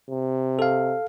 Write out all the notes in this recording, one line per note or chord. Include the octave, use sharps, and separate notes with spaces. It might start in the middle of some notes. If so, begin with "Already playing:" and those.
C3
A4 F5